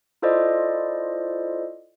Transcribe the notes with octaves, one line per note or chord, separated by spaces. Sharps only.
E4 F4 A4 C5 D5 D#5